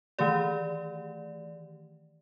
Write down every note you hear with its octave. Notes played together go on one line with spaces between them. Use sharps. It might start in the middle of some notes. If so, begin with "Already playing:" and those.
D#3 E3 A3 G4 D5